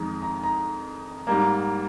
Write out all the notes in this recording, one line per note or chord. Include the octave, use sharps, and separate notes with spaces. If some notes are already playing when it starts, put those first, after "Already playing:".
Already playing: F2 D#3 G#3 A#5
A#5
A#5
G#2 G3 A#3 A#5